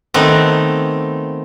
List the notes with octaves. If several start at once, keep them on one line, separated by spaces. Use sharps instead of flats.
D#3 A3 B3 C4